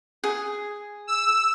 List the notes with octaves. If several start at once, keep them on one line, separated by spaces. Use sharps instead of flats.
G#4
E6